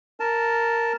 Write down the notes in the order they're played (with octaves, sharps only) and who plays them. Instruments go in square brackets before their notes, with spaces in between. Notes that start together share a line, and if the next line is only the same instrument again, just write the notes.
[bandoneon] A#4 A5